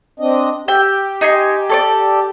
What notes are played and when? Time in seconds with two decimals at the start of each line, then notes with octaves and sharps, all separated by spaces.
0.20 C4 D4 D#5
0.68 G4 G5 E6
1.21 D#4 G#5 C6
1.69 A4 C#5 D5